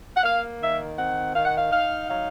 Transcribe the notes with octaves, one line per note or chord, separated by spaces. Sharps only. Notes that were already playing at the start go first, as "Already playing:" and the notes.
F#5
A#3 F5
D#3 E5
C4 F#5
D#3 F5
F#5
F5
D#4 F5
F#3 F5